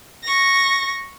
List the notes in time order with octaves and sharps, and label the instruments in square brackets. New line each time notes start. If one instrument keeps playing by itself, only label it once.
[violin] C#6 A#6